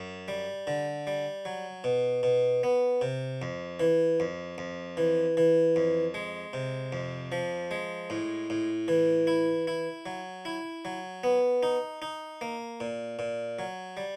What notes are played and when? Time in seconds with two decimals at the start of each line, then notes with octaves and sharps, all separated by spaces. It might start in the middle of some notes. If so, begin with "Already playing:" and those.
Already playing: F#2
0.28 G3
0.67 D3
1.07 G3
1.45 F#3
1.84 B2
2.23 B2
2.63 B3
3.01 C3
3.42 F2
3.80 E3
4.20 F2
4.58 F2
4.97 E3
5.37 E3
5.76 F2
6.14 G#3
6.53 C3
6.93 F2
7.32 F3
7.71 G#3
8.10 A2
8.50 A2
8.88 E3
9.27 E4
9.67 E4
10.06 F#3
10.45 E4
10.85 F#3
11.24 B3
11.63 D#4
12.02 D#4
12.41 A#3
12.80 A#2
13.19 A#2
13.59 F#3
13.97 G3